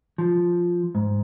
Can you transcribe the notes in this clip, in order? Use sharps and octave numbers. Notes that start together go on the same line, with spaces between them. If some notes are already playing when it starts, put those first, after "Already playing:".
F3
G#2